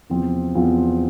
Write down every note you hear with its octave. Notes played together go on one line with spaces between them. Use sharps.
E2 C3 F3 C4 F4
E2 C3 F3 C4 F4